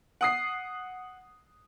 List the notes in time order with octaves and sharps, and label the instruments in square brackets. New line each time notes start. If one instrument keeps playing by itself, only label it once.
[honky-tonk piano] F#5 D#6 C7